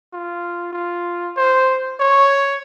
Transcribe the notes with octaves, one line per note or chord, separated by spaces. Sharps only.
F4
F4
C5
C#5